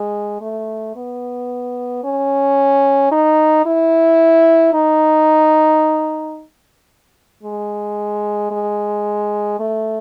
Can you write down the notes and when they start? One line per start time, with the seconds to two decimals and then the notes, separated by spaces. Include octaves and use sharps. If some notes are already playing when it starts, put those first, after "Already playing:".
Already playing: G#3
0.41 A3
0.96 B3
2.04 C#4
3.12 D#4
3.66 E4
4.73 D#4
7.43 G#3
8.51 G#3
9.59 A3